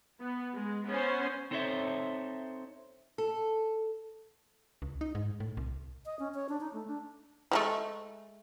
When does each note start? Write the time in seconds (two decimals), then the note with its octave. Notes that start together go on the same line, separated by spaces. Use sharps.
0.21 B3
0.56 G#3
0.88 B3 C#4 C5
1.51 C4 D#4 A4 C5 C#5 E5
3.18 A4
4.82 C#2
5.01 D#4
5.15 G#2
5.40 A2
5.57 C2
6.06 D#5
6.19 C#4
6.35 C#5
6.49 D4
6.60 D#4
6.73 A3
6.87 D4
7.51 F3 G#3 A3